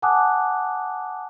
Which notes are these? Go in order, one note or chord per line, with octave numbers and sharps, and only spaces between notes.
F#5 G#5 A5 D6 D#6 F#6